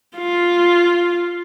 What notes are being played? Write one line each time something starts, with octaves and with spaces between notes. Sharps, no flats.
F4